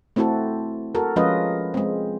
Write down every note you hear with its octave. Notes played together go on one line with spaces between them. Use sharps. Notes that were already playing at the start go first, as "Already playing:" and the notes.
A3 C4 E4 F#4 A4
F#4 A4 A#4
F3 G#3 C#4 F4 B4 D#5
G#3 C4